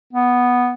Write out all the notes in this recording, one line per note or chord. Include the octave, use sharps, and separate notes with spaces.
B3